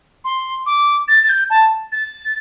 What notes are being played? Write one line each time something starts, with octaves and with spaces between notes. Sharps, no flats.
C6
D6
A6
A6
G6
A5
A6